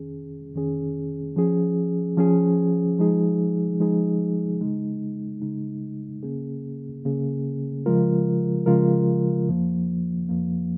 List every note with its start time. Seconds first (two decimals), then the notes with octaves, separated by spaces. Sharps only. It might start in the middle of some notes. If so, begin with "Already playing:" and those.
Already playing: F2 D#3 C#4 G#4
0.54 F2 D#3 C#4 G#4
1.36 F3 C#4 G#4
2.17 F3 C#4 G#4
2.98 F3 G#3 D#4 G#4
3.80 F3 G#3 D#4 G#4
4.61 C#3 G#3 D#4
5.42 C#3 G#3 D#4
6.23 C#3 A#3 C#4 G#4
7.05 C#3 A#3 C#4 G#4
7.86 C#3 F3 G#3 F4 A#4
8.66 C#3 F3 G#3 F4 A#4
9.49 F2 F3 A#3
10.29 F2 F3 A#3